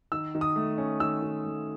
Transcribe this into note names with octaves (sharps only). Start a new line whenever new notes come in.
D#3 E6
D#3
D#6
A3
C#4
D#3 E6
D#3
A3